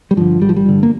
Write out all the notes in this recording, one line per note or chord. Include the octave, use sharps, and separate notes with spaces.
G3
G2 D3 F3
G#1 G3
F3
G3
G2 D3
A#3